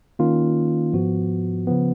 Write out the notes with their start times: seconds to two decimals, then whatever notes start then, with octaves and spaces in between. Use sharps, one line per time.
0.19 D#3 A#3 C#4 F4
0.93 G#2 F3 B3 F#4
1.67 C#3 F3 B3